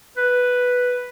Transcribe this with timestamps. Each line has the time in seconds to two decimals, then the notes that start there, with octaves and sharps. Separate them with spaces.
0.17 B4